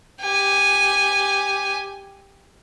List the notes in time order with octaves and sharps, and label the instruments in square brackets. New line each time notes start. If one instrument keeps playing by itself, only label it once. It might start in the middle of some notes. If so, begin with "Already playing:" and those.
[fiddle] G4 G#5